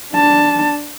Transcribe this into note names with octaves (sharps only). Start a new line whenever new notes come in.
D4 A5